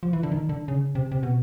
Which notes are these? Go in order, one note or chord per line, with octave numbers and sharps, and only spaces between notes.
F3
E3
D3
D#3
D3
C#3
C3
C3
B2